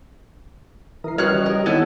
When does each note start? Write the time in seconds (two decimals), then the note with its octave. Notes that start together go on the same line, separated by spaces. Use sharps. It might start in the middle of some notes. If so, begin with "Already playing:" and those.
1.04 E3 A#4 D#6 C7
1.18 G3 C#4 F#4 B4 C#5 D#5 F6 F#6
1.33 C#3 E3
1.46 A#4
1.66 D#3 B3 E4 A4 C#5 G#5